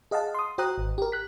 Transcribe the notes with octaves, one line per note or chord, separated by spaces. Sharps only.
G#4 D#5 F5 F#5 A5
C6 D#6
F#4 C5 G5 A#5 D#6 F#6
G#1
G4 A#4
F#6 B6